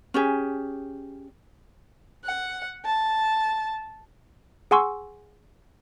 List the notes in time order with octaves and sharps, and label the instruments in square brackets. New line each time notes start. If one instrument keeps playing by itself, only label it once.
[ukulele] C#4 G4 G#4
[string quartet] F#5
A5
[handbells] G#4 F#5 G#5 C6 C#6 E6